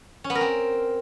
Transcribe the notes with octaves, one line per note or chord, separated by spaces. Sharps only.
C#4
B3
A#4
C4